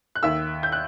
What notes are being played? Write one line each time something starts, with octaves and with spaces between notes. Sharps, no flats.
F#6
D#2 D#3 E5 E6
G6
F#6